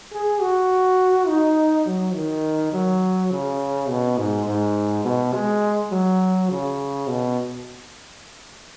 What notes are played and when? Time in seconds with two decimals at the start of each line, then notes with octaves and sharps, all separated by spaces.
0.12 G#4
0.41 F#4
1.27 D#4
1.86 F#3
2.15 D#3
2.73 F#3
3.31 C#3
3.88 B2
4.18 G#2
4.46 G#2
5.04 B2
5.33 G#3
5.91 F#3
6.50 C#3
7.07 B2